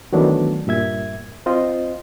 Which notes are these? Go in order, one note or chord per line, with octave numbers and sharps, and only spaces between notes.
D#3 E3 F#3 A3 B3 D4
G2 A#2 E5 G#6
C4 F4 C5 D#5